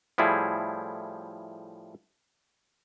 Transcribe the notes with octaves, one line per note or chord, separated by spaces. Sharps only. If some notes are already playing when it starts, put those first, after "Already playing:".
A2 F3 G3 E4 G#4